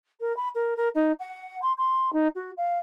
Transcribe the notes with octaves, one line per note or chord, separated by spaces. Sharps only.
A#4
B5
A#4
A#4
D#4
F#5
C6
C6
D#4
F#4
F5